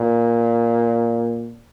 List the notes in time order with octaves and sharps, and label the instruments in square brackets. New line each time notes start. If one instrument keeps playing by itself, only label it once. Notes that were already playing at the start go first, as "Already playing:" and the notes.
Already playing: [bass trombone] A#2